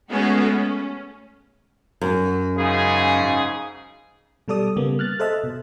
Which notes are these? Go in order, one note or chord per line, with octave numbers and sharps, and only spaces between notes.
G#3 A3 B3 C#4 F#4 G#4
C#4
F#2
G#2 C#3 G#4
B2 G3 A4 D5 D#6
C#3 G3 A#3 B3
F6 F#6 A6
A4 C5 D#5 E5 A5
B2